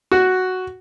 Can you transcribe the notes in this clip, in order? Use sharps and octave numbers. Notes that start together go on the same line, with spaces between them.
F#4